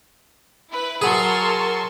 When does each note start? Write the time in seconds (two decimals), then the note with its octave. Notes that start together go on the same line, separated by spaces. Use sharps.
0.71 E4 B4
1.02 F#3 G#4 A#4 A5 C6 C#6